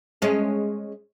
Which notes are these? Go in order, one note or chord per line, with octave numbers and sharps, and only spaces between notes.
G#3 C#4